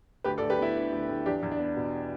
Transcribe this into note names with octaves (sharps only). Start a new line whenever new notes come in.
D2 G4 B4
A4 D5
D2
G4 B4
B3 E4
D3
D2
D2
E2 D4 G4
E2
D4
B3
B2